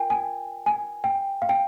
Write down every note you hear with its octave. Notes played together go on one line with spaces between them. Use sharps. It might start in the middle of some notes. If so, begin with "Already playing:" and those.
Already playing: F4 A#4 G5 G#5
G#5
G#5
G5
F5
G5